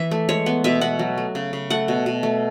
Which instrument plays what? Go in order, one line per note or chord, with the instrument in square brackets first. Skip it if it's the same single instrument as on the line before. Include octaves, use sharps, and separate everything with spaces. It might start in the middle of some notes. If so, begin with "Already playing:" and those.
Already playing: [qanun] E3 E5
A3
G#3 C#5
B3
B2 E5
B2 F#5
F#3
A3
C#3
C#3
A3 F#5
B2
B2
A3